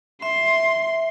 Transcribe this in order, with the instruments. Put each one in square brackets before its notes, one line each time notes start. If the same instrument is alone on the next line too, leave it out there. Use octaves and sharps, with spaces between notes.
[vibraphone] E5 [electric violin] C6